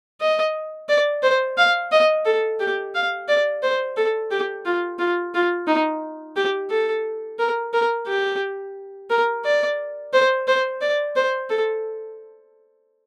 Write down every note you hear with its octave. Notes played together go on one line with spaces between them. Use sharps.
D#5
D5
C5
F5
D#5
A4
G4
F5
D5
C5
A4
G4
F4
F4
F4
D#4
G4
A4
A#4
A#4
G4
A#4
D5
C5
C5
D5
C5
A4